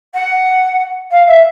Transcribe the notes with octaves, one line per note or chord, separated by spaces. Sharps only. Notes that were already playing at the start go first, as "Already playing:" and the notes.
F#5
F5
E5